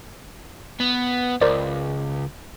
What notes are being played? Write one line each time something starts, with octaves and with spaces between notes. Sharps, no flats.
B3
C#2 A#4 C5 D5